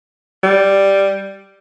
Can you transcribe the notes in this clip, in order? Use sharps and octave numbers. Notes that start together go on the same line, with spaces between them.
G3